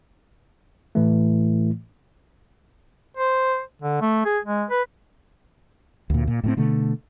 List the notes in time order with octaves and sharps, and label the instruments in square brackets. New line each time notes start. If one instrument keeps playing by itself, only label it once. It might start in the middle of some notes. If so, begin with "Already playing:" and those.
[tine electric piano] A2 E3 A3
[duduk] C5
D3
A3
G#4
G#3
B4
[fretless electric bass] D2 A#2
A#2
A2 E3 C4
B2 D3 A3